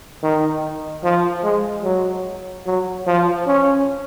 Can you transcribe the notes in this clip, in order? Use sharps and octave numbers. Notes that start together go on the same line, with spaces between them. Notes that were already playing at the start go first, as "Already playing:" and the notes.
D#3
F3
G#3
F#3
F#3
F3
C#4